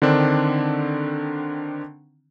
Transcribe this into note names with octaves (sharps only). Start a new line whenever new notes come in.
D3 D#3 C4 D4